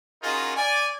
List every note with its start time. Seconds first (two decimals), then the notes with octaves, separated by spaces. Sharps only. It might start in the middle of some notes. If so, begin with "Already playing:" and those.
0.23 C#4 D#4 F4 F#4 G#4 A#4
0.56 D5 G#5